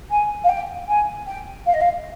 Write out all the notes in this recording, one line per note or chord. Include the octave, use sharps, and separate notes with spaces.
G#5
F5
G5
G#5
G5
F5
D#5
F5